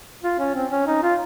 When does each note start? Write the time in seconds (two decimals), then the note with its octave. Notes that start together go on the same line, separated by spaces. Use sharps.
0.23 F4
0.39 C#4
0.55 C4
0.71 C#4
0.87 D#4
1.03 F4